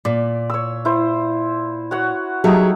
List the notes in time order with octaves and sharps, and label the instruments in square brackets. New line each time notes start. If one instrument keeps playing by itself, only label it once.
[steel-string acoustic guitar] A#2 [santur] D5
[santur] C#5 E6
E4 C5
F#4 C#5 F#5
[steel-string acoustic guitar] F#3 G4 G#4 [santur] A3 D#4